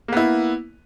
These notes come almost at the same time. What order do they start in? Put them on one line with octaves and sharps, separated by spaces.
A#3 B3 E4